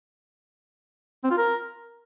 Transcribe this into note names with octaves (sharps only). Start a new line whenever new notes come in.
C4
F4
A#4